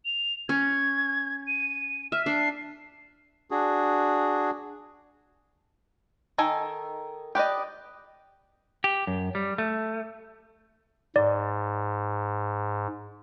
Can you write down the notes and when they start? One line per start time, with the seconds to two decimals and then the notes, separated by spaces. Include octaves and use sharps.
0.05 F7
0.49 C#4 G#6
1.47 D#7
2.12 E5 F6
2.26 D4 C7
3.51 D4 F#4 G#4
6.38 D#3 D#4 A4 G#5
7.35 G4 B4 D5 D#5
8.84 G4
9.07 F#2
9.35 G3
9.58 A3
11.16 G#2 D5